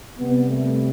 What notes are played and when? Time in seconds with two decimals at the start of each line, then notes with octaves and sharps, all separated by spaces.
0.18 C3 G3 B3
0.48 A3